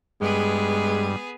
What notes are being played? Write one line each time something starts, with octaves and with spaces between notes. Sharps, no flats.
G2 G#3 B3 G#4